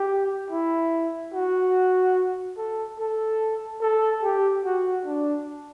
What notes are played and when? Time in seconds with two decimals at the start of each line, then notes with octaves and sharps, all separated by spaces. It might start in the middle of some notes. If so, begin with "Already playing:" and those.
Already playing: G4
0.50 E4
1.34 F#4
2.57 A4
2.99 A4
3.81 A4
4.22 G4
4.65 F#4
5.05 D4